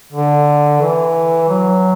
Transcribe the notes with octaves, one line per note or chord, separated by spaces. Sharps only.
D3
E3
F#3